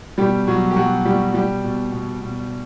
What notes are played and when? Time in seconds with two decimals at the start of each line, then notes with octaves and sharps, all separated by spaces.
0.18 B2 G3 G4
0.47 B2 F#3 F#4
0.71 G4
0.76 B2 F#3 F#4
1.05 B2 G3 G4
1.34 B2 G3 G4
1.64 B2
1.92 B2
2.21 B2